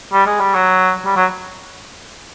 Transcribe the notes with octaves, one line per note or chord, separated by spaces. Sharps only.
G3
G#3
G3
F#3
G3
F#3